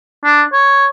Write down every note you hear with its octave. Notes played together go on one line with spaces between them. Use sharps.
D4
C#5